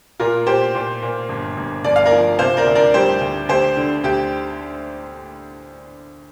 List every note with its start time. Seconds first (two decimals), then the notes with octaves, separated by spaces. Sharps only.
0.20 A#2 F4 A#4
0.46 A#2 G4 C5
0.75 A#2
1.02 A#2
1.29 G1
1.57 G1
1.84 G1 D5
1.96 F5
2.06 A#4 D5
2.12 F3
2.39 C3 C5 F5
2.57 A#4 D5
2.66 D2
2.75 A#4 D5
2.94 G3 G4 C5
3.21 D2
3.49 D2 G4 C5
3.77 D3
4.04 D2 G4